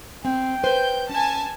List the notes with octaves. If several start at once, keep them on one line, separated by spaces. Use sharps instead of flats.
C4 G5
B4 C5 G6
C#4 G#5 A5